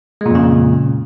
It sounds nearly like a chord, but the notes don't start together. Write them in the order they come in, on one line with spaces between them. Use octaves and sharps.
G#3 A#2 F2 C#3